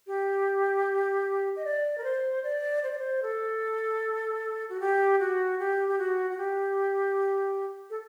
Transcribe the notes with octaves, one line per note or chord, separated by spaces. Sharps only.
G4
D#5
D5
A#4
C5
D5
C5
D5
C5
A4
F#4
G4
F#4
G4
G4
F#4
F#4
G4
A4